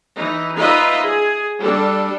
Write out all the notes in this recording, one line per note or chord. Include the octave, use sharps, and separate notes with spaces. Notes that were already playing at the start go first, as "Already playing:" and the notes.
E3 D#4
D#4 F4 B4 D#5 E5
G#4
G3 D4 A4